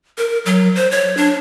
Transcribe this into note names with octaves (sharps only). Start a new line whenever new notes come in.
A#4
F#3
C5
C#5
D4